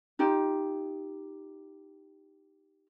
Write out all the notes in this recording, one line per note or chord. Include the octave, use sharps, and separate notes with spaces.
D#4 F4 G4